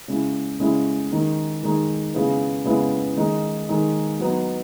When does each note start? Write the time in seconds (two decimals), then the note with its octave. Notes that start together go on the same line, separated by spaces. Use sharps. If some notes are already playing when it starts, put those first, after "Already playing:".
0.08 C#3 G#3 C#4 E4
0.60 C#3 G#3 C#4 E4
1.12 D#3 G#3 D#4
1.63 D#3 G#3 D#4
2.14 C#3 G#3 B3 E4
2.65 C#3 G#3 B3 E4
3.17 D#3 G#3 D#4
3.69 D#3 G#3 D#4
4.20 F#3 B3 D#4